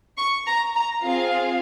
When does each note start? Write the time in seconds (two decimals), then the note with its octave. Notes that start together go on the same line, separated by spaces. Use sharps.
0.17 C#6
0.47 A#5
0.75 A#5
1.03 C4 F4 G#4 F5